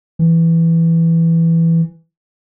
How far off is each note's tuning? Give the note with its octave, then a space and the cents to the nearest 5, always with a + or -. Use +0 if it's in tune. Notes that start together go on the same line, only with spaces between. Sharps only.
E3 +5